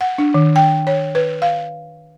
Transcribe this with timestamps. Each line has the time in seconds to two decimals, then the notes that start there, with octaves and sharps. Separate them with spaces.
0.01 F#5
0.18 D4
0.34 D#3
0.56 G5
0.87 C#5
1.15 B4
1.42 F5